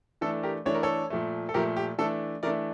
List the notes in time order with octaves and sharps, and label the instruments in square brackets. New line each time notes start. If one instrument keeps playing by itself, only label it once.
[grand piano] E3 A3 D4 A4
G4 A#4
E3 A3 D4 C#5
A#4
A4 C#5
A#2 F3 A3
A4
A#2 F3 A3 G4 A#4
G4
E3 A3 D4 A4
E3 A3 D4 A#4 D5